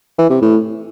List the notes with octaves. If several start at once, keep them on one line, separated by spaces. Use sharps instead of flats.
E3
C3
A2